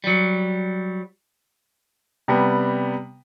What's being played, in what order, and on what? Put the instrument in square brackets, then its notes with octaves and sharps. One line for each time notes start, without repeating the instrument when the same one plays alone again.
[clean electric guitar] F#3 G3
[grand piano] C3 G3 B3